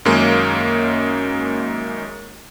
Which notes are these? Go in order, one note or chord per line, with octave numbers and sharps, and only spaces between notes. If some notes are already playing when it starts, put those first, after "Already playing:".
F#2 D#3 G#3 A#3 C#4